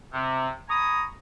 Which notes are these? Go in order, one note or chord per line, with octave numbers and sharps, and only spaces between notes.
C3
G#5 A#5 B5 C#6 D#6